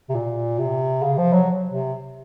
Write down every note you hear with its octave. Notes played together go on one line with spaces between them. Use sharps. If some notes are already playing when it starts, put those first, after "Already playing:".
C3
A#2
C3
C#3
F3
F#3
C3